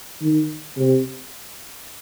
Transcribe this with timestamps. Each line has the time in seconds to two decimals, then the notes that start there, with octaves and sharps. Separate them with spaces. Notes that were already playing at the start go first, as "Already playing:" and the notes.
0.22 D#3
0.77 C3